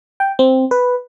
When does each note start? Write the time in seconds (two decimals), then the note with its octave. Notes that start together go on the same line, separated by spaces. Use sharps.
0.20 G5
0.39 C4
0.71 B4